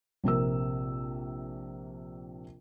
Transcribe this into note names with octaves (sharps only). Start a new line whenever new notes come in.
A#1 C3 A#4 E6